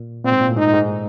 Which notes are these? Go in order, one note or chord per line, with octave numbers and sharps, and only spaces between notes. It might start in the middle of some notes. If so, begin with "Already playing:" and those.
Already playing: A#2
A#2 C4
G#2
A#2
A2
G#2 D#4
G#2